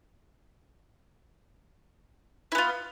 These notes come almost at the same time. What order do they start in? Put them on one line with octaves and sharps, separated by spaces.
E4 B3 F4